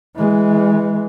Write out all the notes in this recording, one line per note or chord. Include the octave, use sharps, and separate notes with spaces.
E3 G#3